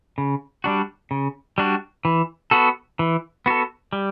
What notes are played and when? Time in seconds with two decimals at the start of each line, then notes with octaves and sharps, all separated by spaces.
0.18 C#3
0.64 G3 D4 F#4
1.11 C#3
1.58 G3 D4 F#4
2.05 E3
2.51 B3 F#4 A4
2.99 E3
3.46 B3 F#4 A4
3.93 G3